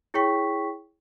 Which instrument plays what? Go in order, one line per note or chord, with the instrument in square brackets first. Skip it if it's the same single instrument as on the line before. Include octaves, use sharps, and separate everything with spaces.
[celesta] E4 G#4 C#5 G5 C#6 B6